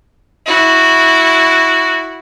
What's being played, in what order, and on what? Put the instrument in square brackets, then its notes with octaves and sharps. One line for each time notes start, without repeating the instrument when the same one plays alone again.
[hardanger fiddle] E4 F#4